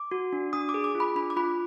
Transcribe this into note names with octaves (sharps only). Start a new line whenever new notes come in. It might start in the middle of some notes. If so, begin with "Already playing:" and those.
Already playing: D6
F#4
D4
D4 D#6
D6
G#4
D6
F4
B5
D4 B5
D6
F4 B5